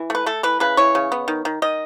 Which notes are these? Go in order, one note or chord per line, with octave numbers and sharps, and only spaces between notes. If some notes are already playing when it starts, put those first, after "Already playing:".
Already playing: E3
A3 B4
A3 A4
E3 B4
C#3 B4
E3 C#5
C#3
B3
D#3
D#3
D#3 D#5